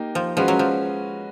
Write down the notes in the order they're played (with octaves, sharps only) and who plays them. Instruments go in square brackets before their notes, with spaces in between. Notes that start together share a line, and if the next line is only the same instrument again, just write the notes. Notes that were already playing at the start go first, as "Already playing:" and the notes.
Already playing: [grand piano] A#3 D#4 G4
[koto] F3
[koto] F3 [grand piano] G#3 C#4 F#4 B4
[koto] F#3
F3